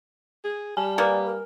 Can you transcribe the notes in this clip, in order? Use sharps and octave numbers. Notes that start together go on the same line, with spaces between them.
G#4
G3 G#5 A5
A#3 B3 D5
A#4